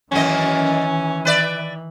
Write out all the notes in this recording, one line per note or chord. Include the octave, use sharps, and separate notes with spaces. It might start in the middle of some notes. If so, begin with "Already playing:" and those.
F#2 D#3 E3 A#3 C#4 D#5
B4 D5 E5